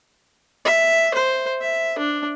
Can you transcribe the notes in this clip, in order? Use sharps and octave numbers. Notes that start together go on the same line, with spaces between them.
E5
C5
E5
D4